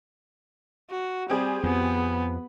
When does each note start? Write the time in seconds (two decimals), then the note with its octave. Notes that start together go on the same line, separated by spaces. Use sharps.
0.90 F#4
1.30 G3 C4 G4 G#4
1.63 F2 F3 B3